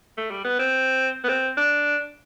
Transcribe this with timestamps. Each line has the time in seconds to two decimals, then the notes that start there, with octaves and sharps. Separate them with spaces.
0.17 A3
0.31 G3
0.45 B3
0.59 C4
1.24 B3
1.29 C4
1.57 D4